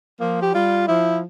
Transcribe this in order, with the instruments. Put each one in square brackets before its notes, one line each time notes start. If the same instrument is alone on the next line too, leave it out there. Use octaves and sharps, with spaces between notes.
[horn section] F3 [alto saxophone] A#3
[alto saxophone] G4
[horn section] G3 [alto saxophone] F4
[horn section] F3 [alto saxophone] E4